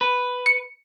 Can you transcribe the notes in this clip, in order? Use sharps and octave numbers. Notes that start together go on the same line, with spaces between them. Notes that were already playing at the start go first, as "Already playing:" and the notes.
B4
C#7